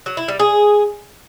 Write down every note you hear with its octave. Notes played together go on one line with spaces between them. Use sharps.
F#3
E4
G3
G#4